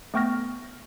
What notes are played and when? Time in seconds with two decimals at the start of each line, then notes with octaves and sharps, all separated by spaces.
0.14 A3 B3 G5 C#6 F6 A#6